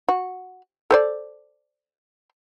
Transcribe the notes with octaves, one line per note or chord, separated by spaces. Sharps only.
F#4
A4 C5 D5